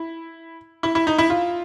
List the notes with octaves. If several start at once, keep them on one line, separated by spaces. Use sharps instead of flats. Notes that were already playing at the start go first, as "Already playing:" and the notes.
Already playing: E4
E4
E4
D#4
E4
F4